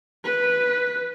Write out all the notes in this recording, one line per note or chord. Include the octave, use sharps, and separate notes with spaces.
B4